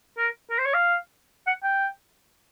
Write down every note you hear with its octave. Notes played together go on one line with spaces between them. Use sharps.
A#4
A#4
C5
C#5
F5
F#5
G5